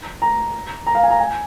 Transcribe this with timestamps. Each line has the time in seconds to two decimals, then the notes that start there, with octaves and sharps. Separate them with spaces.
0.22 A#5
0.87 A#5
0.95 F5
1.03 G#5
1.11 A#5
1.19 G#5